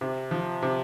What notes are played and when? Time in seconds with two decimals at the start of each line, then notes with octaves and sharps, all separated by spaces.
0.01 C3
0.31 F3
0.63 C3